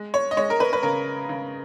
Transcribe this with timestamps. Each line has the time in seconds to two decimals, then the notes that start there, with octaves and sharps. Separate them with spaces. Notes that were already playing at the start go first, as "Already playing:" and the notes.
Already playing: G#3
0.14 C#5
0.31 D#5
0.37 G#3 C#5
0.50 A#4
0.60 B4
0.73 B4
0.83 C#3 A#4
1.29 C#3